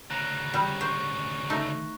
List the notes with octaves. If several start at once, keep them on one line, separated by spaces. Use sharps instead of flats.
D2 C#3 A#5 F#6 A#6
G3
C5 C#6
A3 D#4